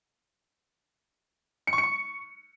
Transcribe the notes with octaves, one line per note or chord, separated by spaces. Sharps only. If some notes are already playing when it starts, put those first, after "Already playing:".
C#7
C#6
C#7
C#6